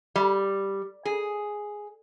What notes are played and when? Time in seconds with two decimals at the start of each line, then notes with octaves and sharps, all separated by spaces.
0.16 G3
1.05 G#4